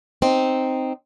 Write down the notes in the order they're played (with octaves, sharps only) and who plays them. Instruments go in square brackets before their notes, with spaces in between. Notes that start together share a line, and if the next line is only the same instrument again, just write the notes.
[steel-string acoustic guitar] C4 D#4